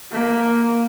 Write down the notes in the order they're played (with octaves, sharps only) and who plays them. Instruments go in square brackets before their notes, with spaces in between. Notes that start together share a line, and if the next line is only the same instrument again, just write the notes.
[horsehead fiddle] A#3